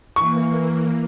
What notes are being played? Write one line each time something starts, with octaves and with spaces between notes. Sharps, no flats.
E3 A#3 C#6